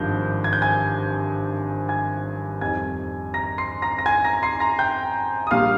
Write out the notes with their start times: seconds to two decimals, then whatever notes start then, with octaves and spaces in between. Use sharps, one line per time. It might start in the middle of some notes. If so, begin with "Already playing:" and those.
Already playing: G#1 G2 F3 G6
0.44 G#6
0.53 G6
0.62 G#5 G#6
1.89 G#5 G#6
2.61 F2 D#3 G3 G#5 G#6
3.34 A#5 A#6
3.58 C6 C7
3.82 A#5 A#6
3.98 A#6
4.06 G#5 G#6
4.24 A#5 A#6
4.43 C6 C7
4.60 A#5 A#6
4.79 G5 G6
5.47 D#6
5.51 A#1 A#2 G3 F5 F6